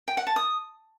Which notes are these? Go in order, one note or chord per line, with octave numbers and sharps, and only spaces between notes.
G5
F#5
A5
D#6